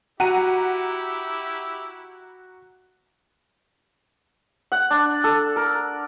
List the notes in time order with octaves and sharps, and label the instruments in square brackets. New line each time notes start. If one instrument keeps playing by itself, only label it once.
[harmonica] E4 G4 [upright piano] F#4 [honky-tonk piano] F#5 A#5 D#7
[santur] F#5
D4
A4
A#4